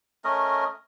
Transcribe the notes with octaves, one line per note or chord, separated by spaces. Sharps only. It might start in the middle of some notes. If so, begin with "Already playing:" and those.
A3 C#4 A#4 D#5